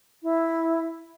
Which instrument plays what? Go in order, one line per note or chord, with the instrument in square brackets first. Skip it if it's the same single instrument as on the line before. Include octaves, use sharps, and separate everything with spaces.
[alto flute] E4